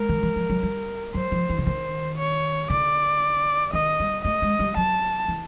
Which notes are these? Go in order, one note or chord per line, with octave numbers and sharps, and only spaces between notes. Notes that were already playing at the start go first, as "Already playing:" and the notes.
Already playing: G#3 A#4
D#3
E3
F3
F#3
G3
F#3 C5
F3
E3
D3
D#3 C5
C#5
D3 D5
D#3 D#5
G3
A3 D#5
G#3
G3
F#3 A5
E3